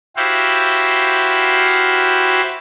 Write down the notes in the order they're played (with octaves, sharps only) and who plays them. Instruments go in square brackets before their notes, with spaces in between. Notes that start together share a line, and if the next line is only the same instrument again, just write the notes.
[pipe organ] E4 F#4 G4 C5 F5